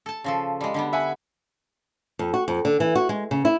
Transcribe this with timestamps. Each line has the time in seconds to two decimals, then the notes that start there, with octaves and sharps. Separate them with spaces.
0.06 A4 A5
0.24 C#3 F3 A4
0.61 G3 G#3
0.74 D3 G3 B3
0.93 E5 F#5 G#5
2.19 F2
2.33 F#4
2.48 F2
2.65 D3
2.80 E3
2.95 F#4
3.09 G#3
3.31 C#3
3.45 E4